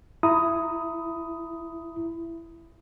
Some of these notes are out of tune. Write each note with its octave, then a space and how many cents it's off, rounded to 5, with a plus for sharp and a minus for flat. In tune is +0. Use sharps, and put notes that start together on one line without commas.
E4 +15 A#5 +0 D#6 +5